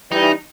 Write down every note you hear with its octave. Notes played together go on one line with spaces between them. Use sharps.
E3 G3 D#4